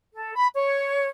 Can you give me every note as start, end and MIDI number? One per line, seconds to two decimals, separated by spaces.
0.14 0.35 69
0.35 0.47 83
0.55 1.08 73